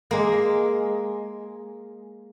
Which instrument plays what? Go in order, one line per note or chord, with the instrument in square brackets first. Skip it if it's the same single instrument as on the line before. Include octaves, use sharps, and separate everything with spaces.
[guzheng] G#3 A#3